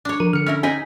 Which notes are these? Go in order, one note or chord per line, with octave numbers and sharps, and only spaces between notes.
D4 C#5
F3 A#4 D#7
D3 F6 C#7
C#4 E4 A#4 F6
C4 C#4 D#4 G#4 G5 G#5 B6